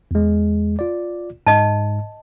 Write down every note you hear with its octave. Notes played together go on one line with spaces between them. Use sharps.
E2 G#3
F4 D5
G#2 D#5 A5